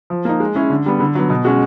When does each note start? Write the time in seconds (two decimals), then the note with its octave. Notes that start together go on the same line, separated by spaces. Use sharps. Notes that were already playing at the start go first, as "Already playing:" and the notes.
0.10 F3
0.25 A#3 D#4
0.40 G#3
0.55 C#4 E4 G#4
0.70 D3
0.86 G3 B3
1.00 D3
1.15 F#3 B3
1.30 B2
1.45 G#3 C#4 F#4